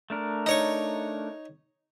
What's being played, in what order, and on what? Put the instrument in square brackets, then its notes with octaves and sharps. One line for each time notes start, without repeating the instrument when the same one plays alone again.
[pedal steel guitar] A3 D4 A#4
[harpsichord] D#4 C#5 C#6